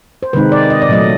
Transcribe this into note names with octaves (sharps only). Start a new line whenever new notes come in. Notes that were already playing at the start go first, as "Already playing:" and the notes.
C5
C3 D#3 G#3 C4 D#4 B4
D5
D#5
D5
A#2 F#3 A3 D#5